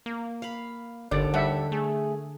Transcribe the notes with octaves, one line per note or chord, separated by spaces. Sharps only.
A#3
F5 B5
G1 D#2 D3 D5
G3 A4 E5 F#5
A3 G#4